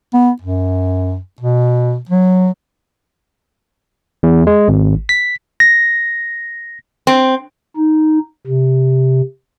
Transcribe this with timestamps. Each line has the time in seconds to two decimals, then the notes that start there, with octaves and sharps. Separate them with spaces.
0.14 B3
0.42 F#2
1.40 B2
2.09 F#3
4.23 E2
4.47 G#3
4.68 G#1
5.09 B6
5.60 A#6
7.07 C4
7.77 D#4
8.47 C3